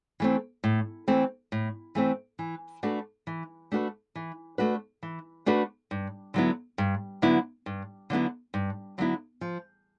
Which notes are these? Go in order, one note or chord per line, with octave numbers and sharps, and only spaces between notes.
E3 A3 C4
A2
E3 A3 C4
A2
E3 A3 C4
E3
A3 D4 F#4 B4
E3
A3 D4 F#4 B4
E3
A3 D4 F#4 B4
E3
A3 D4 F#4 B4
G2
D3 F#3 B3 E4
G2
D3 F#3 B3 E4
G2
D3 F#3 B3 E4
G2
D3 F#3 B3 E4
F3